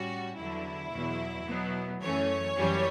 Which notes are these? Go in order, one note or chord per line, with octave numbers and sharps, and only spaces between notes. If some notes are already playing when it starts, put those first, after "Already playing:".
Already playing: A2 G3 C#4 F#4
E2 D3 F#3 E4
E2 B2 F#3
B2 F#3 B3
F#2 E3 A3 C#4 C#5
F#2 E3 G3 C#4